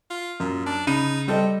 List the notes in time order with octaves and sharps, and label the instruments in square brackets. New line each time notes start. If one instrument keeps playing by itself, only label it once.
[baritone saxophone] F4
[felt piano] F#2 [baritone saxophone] A#2
[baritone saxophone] D4
[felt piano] C#3 B5 D#7 [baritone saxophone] D#4
[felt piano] G3 A4 D#5 [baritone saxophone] C4